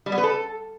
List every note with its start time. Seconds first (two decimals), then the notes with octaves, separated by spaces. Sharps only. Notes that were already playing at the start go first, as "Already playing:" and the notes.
0.06 G3
0.12 B3
0.18 B4
0.24 A4